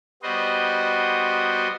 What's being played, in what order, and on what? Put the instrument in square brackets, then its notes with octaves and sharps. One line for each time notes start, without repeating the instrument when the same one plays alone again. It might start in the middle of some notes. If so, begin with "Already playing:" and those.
[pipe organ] G3 B3 F#4 C5 D#5